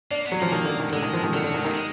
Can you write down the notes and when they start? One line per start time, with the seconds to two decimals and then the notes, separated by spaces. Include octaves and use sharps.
0.11 A#3 D4
0.25 B3
0.32 F#3
0.39 F3 A#3
0.52 D#3
0.65 D3
0.80 D#3
0.93 D3 G#3
1.02 D#3
1.13 F3
1.24 D#3
1.34 D3 F#3
1.44 D3
1.54 D#3
1.64 D#3
1.74 G#3